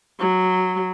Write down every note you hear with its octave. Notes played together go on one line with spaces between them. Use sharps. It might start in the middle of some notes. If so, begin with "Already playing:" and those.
F#3